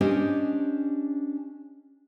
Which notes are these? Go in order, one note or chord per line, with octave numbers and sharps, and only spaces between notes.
C#4 D4 G4 C5 D#5